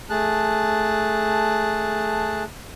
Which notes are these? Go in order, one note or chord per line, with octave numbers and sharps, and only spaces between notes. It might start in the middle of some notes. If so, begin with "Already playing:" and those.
A3 G#4 A5 F#6